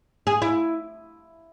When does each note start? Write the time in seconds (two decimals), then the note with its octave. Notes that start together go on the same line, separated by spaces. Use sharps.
0.27 G#4
0.42 E4